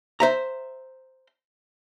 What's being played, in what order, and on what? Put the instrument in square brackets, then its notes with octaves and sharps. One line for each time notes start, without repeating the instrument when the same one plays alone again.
[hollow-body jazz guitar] C5 E5 A#5